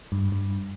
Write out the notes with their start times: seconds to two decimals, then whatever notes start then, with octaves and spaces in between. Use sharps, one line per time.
0.12 G2
0.32 G2